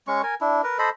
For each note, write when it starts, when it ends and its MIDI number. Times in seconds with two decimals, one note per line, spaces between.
0.07 0.22 56
0.07 0.22 61
0.07 0.22 85
0.23 0.35 70
0.23 0.35 80
0.41 0.61 62
0.41 0.61 64
0.63 0.78 70
0.63 0.78 71
0.79 0.90 69
0.79 0.90 72
0.79 0.90 75
0.79 0.90 83